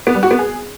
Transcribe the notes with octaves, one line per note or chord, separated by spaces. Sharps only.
B3
G3
F#4
B3
G#4